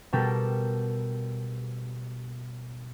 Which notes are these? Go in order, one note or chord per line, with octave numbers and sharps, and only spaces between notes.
B2 G3 G4 A4 A#4